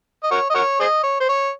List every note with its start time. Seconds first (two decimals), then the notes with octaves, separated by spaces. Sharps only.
0.23 D#5
0.31 F#4 A#4 C#5
0.50 D#5
0.55 F#4 A#4 C#5
0.80 G#4 C5 D#5
1.03 C#5
1.20 C5
1.29 C#5